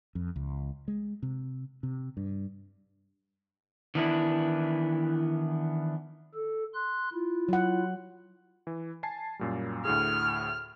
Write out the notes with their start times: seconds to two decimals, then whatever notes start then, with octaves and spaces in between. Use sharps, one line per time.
0.15 F2
0.36 C#2
0.88 G#3
1.23 C3
1.83 C3
2.17 G2
3.95 D#3 E3 B3 D4 E4
6.35 A4
6.74 C6 F#6
7.13 E4 F4
7.49 F#3 F#5
8.67 E3
9.03 G#5 A5 C7
9.39 F#2 A#2 G3
9.85 D2 A2 G#4 F6